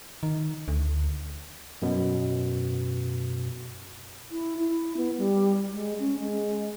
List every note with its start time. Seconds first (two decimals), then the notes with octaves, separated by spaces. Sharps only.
0.23 D#3
0.68 D2
1.82 F#2 B2
4.31 E4
4.58 E4
4.97 B3
5.18 G3
5.72 G#3
5.99 C#4
6.19 G#3